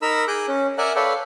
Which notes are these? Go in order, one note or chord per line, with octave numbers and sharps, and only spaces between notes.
D#4 A#4 A#5 B5 E6
G#4 D6 F#6 G6
C#4
A#4 D5 E5 F#5 G#5 F#6
A4 B4 C#5 D5 F5 G5